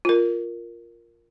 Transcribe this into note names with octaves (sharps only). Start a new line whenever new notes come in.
F4 A#4